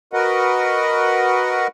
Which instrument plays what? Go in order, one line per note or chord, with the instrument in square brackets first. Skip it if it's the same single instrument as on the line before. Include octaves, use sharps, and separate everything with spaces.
[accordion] F#4 A#4 B4 D#5 F#5